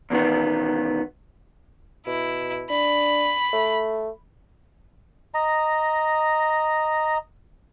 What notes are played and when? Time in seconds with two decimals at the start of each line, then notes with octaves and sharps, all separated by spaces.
0.10 E2 B2 D#3 B3
2.07 B2 E4
2.70 D4 B5
3.53 A3
5.34 D#5 A#5